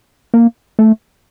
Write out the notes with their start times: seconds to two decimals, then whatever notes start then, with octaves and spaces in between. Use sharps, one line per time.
0.34 A#3
0.79 A3